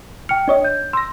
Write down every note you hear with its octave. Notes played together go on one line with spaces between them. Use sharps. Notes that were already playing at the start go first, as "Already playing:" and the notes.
G5 F6 C#7
D4 C#5 D#5
G6
C6 E6 A#6